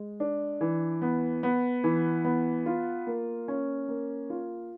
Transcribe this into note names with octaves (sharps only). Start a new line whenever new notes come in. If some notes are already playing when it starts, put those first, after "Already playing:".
Already playing: G#3
D4
E3
B3
B3
E3
B3
F4
A#3
C#4
A#3
F4